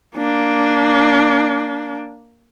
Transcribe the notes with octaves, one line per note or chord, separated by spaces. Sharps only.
A#3 D4